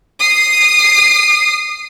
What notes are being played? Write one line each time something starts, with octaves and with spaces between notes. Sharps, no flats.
D#6 C7